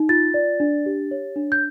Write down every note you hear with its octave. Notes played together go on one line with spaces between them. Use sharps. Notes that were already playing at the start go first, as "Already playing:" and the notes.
Already playing: D#4
F4 A6
D5
D4
G4
C#5
D4
G6